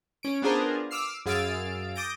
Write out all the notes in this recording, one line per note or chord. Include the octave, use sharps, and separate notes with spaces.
C#4 D7
B3 D4 F4 G#4 A#4 C5
D6 E6 F6 C7
F#2 G#4 F5 E6 A6 D7
D6 D#6 G6 A6 A#6 D7